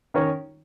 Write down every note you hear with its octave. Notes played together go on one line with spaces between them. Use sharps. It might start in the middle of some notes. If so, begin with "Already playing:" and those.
D#3 C#4 A#4 C#5